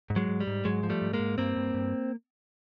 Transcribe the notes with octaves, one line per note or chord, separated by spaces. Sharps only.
G#2
F#3 G#3
G#2
G3
G#2
G#2 F#3 G#3
F3
G3 A3
G#2
G#3 A#3
G#2
G2 A#3 C4
G2
G2